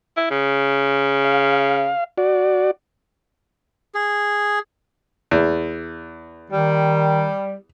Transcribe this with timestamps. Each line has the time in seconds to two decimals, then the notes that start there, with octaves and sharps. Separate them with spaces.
0.17 E4
0.31 C#3
1.24 F5
2.18 F#4 D5
3.95 G#4
5.31 E2
6.51 D#3 G3